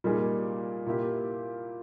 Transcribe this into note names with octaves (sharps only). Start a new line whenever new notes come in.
A#2 G3 A#3 D#4 G#4
A#2 A#3 E4 G4